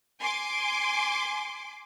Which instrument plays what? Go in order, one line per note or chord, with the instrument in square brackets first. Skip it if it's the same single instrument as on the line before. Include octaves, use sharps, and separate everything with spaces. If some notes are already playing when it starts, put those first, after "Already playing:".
[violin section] G#5 C6 D6